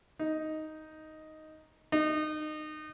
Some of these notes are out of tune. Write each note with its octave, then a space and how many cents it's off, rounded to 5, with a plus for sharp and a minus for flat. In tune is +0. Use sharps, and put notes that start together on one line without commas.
D#4 +5
D#4 -25